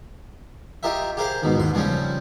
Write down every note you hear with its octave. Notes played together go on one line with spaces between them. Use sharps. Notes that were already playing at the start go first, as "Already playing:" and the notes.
F4 G4 A#4 D#5 E5
G4 G#4 A#4 C5 F5
G#2 B2 D#3
D#2 G#2 C6
C#3 F3 G3 C4 C#4